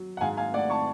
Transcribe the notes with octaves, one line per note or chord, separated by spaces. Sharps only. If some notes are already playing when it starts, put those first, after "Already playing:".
Already playing: F#3
F#5
G#2 F5 G#5
F5 G#5
A3 D5 F#5
A5 C#6